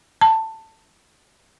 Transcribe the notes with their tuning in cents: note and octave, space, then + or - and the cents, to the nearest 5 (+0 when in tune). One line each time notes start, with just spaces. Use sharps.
A5 +15